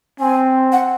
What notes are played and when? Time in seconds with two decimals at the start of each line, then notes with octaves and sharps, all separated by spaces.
0.20 C4 G#5
0.72 F#5